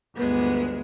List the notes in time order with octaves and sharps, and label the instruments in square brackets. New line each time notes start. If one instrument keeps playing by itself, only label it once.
[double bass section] G1 D2 [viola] G#3 B3